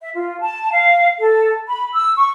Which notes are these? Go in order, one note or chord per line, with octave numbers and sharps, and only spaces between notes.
E5
F4
A5
F5
A4
B5
E6
C#6